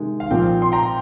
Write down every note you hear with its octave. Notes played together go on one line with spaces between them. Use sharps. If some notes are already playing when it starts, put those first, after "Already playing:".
Already playing: C3 D#3 G#3 D#4
F5
A#2 F3 C4 F4 G5
C6
G5 A#5